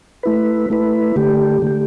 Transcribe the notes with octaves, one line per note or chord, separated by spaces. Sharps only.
A3 E4 B4
A3 E4 B4
D3 A3 G4
D3 A3 G4